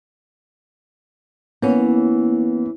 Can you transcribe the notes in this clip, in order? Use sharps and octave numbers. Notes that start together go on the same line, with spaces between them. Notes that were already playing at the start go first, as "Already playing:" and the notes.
E3 A#3 B3 C#4